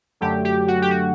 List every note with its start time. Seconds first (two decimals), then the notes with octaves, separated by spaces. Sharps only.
0.21 F#2 D3 F#3 A3 G4
0.45 G4
0.68 F#4
0.82 G4
0.91 F#4